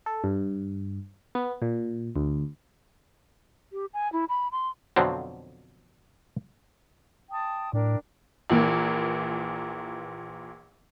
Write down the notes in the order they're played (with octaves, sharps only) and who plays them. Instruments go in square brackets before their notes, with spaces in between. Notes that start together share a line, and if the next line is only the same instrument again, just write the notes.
[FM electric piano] A4
G2
B3
A#2
D2
[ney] G4
G#5
E4
B5
C6
[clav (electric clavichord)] F2 B2 D3 F3 F#3 C4
[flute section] G5 A5 D#6
[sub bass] A2 [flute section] D4 A#4 G5
[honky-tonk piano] A#1 A#2 E3 A#3